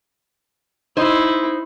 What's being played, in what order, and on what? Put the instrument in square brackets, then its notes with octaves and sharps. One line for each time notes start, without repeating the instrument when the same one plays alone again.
[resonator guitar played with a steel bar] D#4 C5 [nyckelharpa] E4